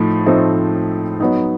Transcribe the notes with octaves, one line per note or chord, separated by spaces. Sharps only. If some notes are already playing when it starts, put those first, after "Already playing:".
Already playing: A2 F3 A3 D#4
A2 F3 A3 C4 D#4
F#3 B3 D#4